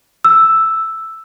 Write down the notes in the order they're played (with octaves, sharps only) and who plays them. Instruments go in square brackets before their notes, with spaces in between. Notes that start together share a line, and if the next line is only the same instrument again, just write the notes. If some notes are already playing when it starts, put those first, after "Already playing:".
[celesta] E6